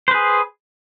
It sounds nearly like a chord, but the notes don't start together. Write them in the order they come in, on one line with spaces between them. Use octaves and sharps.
C5 B4 G#4